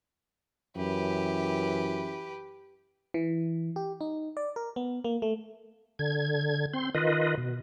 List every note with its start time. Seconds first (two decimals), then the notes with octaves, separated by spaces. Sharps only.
0.76 F#2 E3 G4 B4
3.14 E3
3.76 G4
4.01 D#4
4.37 D5
4.56 A#4
4.76 B3
5.04 A#3
5.22 A3
5.99 D3 G#6
6.73 C4 C6
6.95 D#3 F4 B4 D#5
7.37 B2